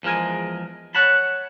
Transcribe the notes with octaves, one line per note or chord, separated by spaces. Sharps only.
E2 F3 G#3 A#4 G#5
C#5 F#5 A5 B5